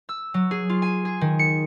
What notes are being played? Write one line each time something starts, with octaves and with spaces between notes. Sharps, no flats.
E6
F#3
G#4
F4
G#5
G#4
D#3
C#7